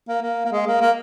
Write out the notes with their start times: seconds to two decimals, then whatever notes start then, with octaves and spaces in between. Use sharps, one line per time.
0.09 A#3
0.22 A#3
0.45 A#3
0.52 G#3
0.67 A#3
0.81 A#3